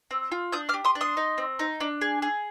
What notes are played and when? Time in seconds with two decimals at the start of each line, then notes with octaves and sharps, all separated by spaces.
0.11 C4
0.32 F4
0.52 D4 D#6 G6
0.69 D6 F6
0.74 G4
0.85 C6 D#6
0.95 D4
1.01 C6 D#6
1.17 D#4
1.38 C4
1.59 D#4
1.80 D4
2.01 G#4
2.22 G#4